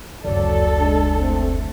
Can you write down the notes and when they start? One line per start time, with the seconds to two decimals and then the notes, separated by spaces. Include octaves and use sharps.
0.25 F#1 D2 F#3 A4 D5
0.79 G#3 D4
1.19 A3 C4